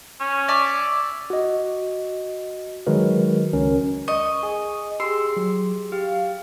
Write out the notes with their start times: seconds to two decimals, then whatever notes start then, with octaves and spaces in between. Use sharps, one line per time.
0.20 C#4
0.48 D5 E5 A5
1.30 F#4 D#5
2.87 D#3 F#3 G#3 F#4 A#4 B4
3.53 C#2 C#4 A#4
4.08 D#5 C#6
4.43 G#4
5.00 G4 G#4 C6 E6
5.37 F#3
5.92 G4 F5